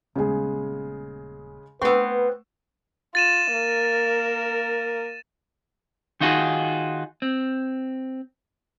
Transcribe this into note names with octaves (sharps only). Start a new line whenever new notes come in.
D#1 C#3 G#3 B3 G#4
A3 B3 C4 B4 C#6 E6
F4 A6 D#7 E7
A#3 A#4
D#3 D#4 F4 F#4 G#4
C4